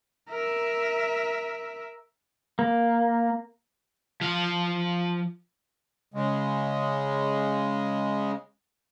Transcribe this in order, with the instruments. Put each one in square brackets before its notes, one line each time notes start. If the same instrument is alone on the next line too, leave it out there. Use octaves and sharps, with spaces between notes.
[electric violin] A#4 E5
[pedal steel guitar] A#3
[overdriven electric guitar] F3 F5
[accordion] C#3 G#3